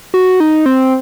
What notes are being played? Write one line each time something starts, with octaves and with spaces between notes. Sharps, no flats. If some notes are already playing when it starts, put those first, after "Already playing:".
F#4
D#4
C4